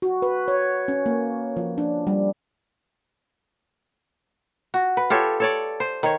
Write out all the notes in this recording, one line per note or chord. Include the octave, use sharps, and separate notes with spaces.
F#4
B4
C#5
C#4
A#3
F3
D4
G3
F#4
B4
F4 G4 A4 C#5
A4 C#5 D5
C5
D#3 C#5